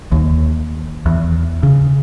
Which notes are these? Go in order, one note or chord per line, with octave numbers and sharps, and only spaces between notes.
D#2
E2
C#3